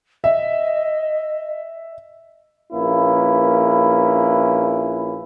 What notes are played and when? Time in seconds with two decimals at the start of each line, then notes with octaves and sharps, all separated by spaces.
0.24 D#5 E5
2.72 A#1 A#3 C#4 E4 B4